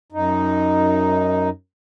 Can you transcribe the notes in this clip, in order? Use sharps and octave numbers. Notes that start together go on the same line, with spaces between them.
F#2 D#4